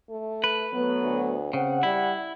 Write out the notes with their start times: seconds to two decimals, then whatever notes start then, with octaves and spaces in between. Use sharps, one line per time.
0.10 A3
0.44 B4
0.73 F#3 A3 B3
1.03 D2
1.53 C#3 C4 F#5
1.83 G3 E4